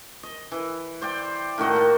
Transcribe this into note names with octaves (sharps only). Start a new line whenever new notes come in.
D#5
E3
C5 D5 G5
A2 D#3 F#4 D#5
A#3 A5